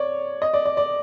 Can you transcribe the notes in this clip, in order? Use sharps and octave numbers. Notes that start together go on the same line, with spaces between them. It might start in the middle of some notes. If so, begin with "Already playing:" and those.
Already playing: C#5 D5
D#5
D5
D5
D5